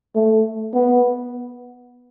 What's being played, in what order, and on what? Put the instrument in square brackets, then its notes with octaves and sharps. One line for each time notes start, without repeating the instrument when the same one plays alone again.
[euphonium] A3
B3